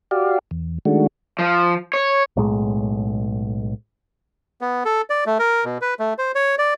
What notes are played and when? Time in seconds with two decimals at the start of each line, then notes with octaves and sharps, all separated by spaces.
0.11 F#4 G4 D5 F5
0.51 E2
0.85 D#3 G#3 A3 D4 F#4
1.39 F3
1.93 C#5
2.36 B1 A2 G#3
4.61 B3
4.85 A4
5.10 D5
5.26 A3
5.39 A#4
5.64 B2
5.81 B4
6.00 A3
6.18 C5
6.35 C#5
6.58 D5